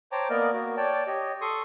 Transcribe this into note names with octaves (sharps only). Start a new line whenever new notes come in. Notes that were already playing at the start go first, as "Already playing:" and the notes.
C5 C#5 G5 A5 A#5 D6
A#3 B3 A#4 D5 D#5
A#3 F#4
C#5 D5 G5 A5
G4 C#5 D#5
A4 C6 C#6 D#6